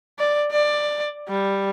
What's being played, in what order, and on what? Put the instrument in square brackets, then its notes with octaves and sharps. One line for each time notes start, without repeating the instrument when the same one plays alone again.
[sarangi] D5
D5
G3